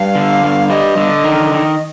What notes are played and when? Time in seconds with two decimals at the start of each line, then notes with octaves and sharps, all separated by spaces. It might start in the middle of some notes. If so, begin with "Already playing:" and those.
Already playing: G2 F5
0.15 D3
0.43 G2
0.70 G3 D#5
0.97 D3
1.24 D#3
1.52 D#3